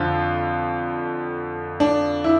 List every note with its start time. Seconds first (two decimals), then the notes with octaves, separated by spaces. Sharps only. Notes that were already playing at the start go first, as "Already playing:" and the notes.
Already playing: F2 D3 F3 F4
1.80 D4
2.24 E4